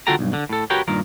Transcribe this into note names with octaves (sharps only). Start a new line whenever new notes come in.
D3 F4 F#4 A4 G5 A#5
B1 G2
D3
A2 A4
F#4 G4 A#4 B4 C#5 G5
G2 A#2 D#3 A#4